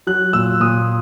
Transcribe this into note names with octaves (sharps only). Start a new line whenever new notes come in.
F#3 F#6
A#2 E6
A#2 D#6